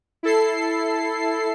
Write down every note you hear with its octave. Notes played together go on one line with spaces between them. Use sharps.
E4 A4 C7